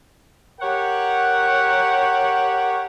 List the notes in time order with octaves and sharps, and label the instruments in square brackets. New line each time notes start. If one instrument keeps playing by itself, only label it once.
[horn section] G4 A#4 C#5 F#5